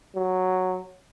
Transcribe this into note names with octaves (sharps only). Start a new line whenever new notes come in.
F#3